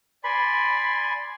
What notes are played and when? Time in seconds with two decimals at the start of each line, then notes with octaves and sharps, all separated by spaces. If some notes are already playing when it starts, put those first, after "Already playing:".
0.24 D5 G#5 B5 C6